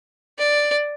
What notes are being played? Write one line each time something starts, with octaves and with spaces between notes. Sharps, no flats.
D5